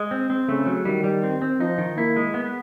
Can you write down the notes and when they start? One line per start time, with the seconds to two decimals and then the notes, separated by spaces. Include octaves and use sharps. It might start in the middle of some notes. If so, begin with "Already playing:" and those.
Already playing: G#3
0.11 C4
0.30 C4
0.49 C#3 A3
0.66 F#3
0.85 D#3 G3
1.04 G3
1.23 C4
1.42 C4
1.60 F3 D#4
1.78 D#3
1.97 A#3 E4
2.16 G#3
2.34 B3